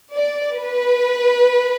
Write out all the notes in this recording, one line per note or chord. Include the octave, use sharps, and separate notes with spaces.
D5
B4